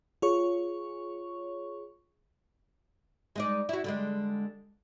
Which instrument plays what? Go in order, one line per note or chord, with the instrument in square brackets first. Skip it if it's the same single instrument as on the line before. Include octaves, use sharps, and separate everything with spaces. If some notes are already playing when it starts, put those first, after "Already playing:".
[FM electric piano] F4 G#4 C#5 C#6
[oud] G#3 D#4 D5
E4 F#4
D3 G3 G#3